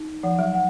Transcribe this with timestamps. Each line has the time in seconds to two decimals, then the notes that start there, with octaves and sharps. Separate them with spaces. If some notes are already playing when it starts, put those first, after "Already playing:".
Already playing: D#4
0.23 F3 F#5
0.39 F#3
0.54 F#5